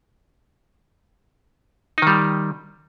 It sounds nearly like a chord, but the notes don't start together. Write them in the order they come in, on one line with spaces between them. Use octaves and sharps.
D#4 D#3 G3